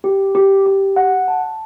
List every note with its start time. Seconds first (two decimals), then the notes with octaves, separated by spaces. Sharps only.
0.04 G4
0.35 G4
0.66 G4
0.96 F#5
1.28 A5